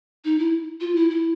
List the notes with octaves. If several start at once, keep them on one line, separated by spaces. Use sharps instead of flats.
D#4
E4
F4
E4
E4